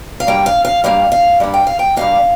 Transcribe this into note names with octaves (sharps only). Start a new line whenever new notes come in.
F5
G2 G3 A#3 G5
F5
F5
G2 G3 A#3 F5
F5
G2 G3 A#3
G5
F5
G5
G2 G3 A#3 F5